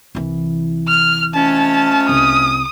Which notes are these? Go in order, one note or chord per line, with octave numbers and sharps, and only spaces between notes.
C2 E3
F6
F2 A3 C#4 A5
C2 D#6